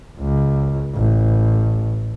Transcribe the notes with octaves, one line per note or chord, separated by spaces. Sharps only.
C#2
A1